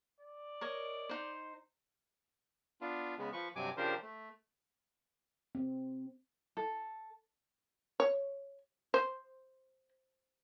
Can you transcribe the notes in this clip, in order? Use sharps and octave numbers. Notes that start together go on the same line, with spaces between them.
D5
A#4 C#5 D#5
D#4 C5
B3 D4 F4
C#3 G#3 B3
F3 B4 C#6
G2 C3 F#3 G#5 D6
C#3 F3 D4 G4 A#4 C5
A3
C4
A4
C#5
C5